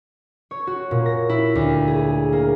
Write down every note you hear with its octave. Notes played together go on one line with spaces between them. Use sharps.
C#5
F#4
A#2
A#6
E4
D2
G#4
A#3